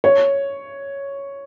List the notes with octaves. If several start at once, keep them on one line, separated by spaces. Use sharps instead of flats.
C#5